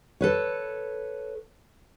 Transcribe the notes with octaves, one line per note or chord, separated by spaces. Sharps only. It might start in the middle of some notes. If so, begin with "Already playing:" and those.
A4 B4 C#5